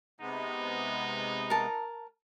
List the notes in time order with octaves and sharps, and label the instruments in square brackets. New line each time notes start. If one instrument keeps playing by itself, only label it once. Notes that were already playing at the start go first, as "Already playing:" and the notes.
[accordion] C3 G#3 B3 [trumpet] D#4
[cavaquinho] A#4 A5